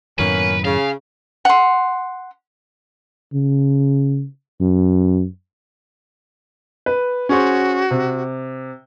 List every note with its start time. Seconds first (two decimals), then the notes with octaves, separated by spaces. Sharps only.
0.19 F#2 A2 D#3 A#3 B3 C#4 B4
0.65 C#3 F5
1.45 F#5 C6
3.33 C#3
4.60 F#2
6.86 B4
7.29 C#4 F#4 G#4 C5
7.91 C3